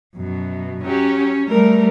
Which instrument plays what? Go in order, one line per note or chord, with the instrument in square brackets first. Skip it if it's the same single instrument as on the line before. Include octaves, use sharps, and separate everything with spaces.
[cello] F#2 B2
[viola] F#3 G4 [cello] C#4
[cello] G3 A3 [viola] A#4